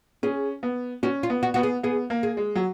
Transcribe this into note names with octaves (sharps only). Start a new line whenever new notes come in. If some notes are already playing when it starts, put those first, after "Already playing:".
C#4 G#4
B3
C#4 F#4
F4
B3
F#4
B3 F#4
G#4
B3 G#4
A#3
G#4
G#3
F#3